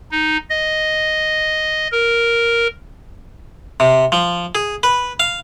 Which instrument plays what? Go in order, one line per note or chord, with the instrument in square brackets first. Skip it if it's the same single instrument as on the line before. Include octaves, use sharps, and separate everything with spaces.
[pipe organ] D#4
D#5
A#4
[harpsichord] C3
F3
G#4
B4
F5